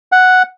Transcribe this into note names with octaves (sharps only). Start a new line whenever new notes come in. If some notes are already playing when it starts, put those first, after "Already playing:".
F#5